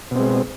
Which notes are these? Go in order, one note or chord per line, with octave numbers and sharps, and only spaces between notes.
B2 G#3 C4